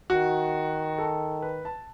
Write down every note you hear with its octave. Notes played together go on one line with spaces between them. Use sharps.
D#3 F#4
A4
B4
A5